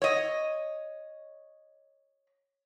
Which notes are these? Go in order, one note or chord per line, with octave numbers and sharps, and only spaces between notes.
C#5 D#5